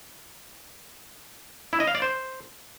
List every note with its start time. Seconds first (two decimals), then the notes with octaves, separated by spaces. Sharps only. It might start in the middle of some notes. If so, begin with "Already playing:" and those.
1.73 E4
1.80 D#5
1.87 F5
1.95 D5
2.02 C5